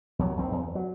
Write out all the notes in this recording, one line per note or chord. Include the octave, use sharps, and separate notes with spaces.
D#2 F#3
A#1 C4
E2
F#3